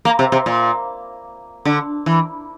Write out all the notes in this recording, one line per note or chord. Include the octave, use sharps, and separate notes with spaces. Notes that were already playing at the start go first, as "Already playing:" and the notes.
A#3
C3
C3
A#2
D3
E3